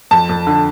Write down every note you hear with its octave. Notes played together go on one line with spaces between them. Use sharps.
F2 A5
F2
D3